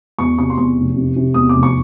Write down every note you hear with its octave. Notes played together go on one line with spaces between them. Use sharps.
E2 C#6
C3 C#6
C6
E2 C#6
F1
C3
C3
E2 D#6
F1 D6
C#6